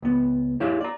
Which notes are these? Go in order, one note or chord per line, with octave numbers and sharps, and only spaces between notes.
C#2 B3
E4 G4 G#4 C#5 F5
D5 A#5